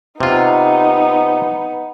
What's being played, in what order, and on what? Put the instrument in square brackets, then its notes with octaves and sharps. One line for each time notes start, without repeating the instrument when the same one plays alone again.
[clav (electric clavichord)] C3 F4 [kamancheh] B3 D#4